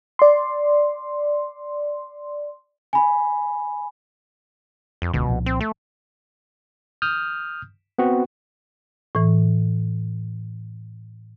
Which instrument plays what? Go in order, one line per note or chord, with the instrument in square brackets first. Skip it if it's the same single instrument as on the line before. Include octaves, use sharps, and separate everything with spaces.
[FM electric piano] D5 C6
[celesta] G#5 B5
[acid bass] F2
[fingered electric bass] D#1 C#2 D3 [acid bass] B2
[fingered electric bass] C2 A#2 F3
[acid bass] C4
A3
[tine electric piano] D#6 F6 G6
B3 C4 F#4
[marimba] A2 E3